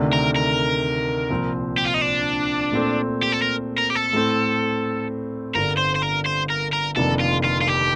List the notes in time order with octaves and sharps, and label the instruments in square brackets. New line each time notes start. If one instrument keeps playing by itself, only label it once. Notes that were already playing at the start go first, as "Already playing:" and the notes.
Already playing: [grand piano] D2 C3 D#3 A3 D4
[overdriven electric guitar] A#4
A#4
[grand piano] C2 A#2 F3 C4
[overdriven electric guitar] G4
F4
D#4
D4
[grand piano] A#2 A3 C4
[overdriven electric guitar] G4
A4
A#4
A#4
G4
A4
[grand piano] A2 A3 C4
[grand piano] G1 G2 D3 [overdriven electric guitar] A#4
[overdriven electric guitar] C5
C5
A#4
C5
A#4
A#4
[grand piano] F1 F2 D#3 A#3 D4 [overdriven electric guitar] A4
[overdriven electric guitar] F4
F4
F4
G4